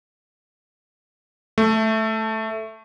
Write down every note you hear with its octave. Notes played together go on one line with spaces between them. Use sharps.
A3